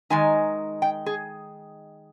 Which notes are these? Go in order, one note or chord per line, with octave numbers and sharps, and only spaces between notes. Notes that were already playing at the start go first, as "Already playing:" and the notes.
D#3 G#3 D#4 G#5
G5
G#4